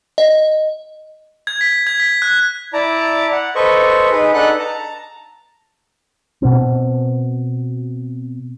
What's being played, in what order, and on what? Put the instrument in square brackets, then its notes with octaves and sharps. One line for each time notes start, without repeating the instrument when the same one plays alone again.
[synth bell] D#5
[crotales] G#6
B6
G#6
B6
F#6
[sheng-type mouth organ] E4 D5 A5 A#5
F#5
A4 B4 C5 D#5 C#6
D#4 G#4 B4
D4 D#4 A4 B4 F#5 F#6
A5 A#5
[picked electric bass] B2 C4